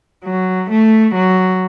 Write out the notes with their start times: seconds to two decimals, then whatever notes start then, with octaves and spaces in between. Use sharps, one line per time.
0.24 F#3
0.70 A3
1.14 F#3